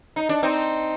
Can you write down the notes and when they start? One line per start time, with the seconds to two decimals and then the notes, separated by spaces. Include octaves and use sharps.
0.16 D#4
0.29 D4
0.43 C4 D#4